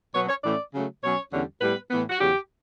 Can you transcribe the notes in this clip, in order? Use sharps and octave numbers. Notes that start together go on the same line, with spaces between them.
B2 F#3 B3 C#5
C#5
A2 E3 A3 C#4 D5
C#3 F#3 A3
B2 F#3 C#4 C#5
E2 D3 G3 C#4
A2 G3 B3 B4
A2 E3 B3
F#4
E2 C#3 F#3 G4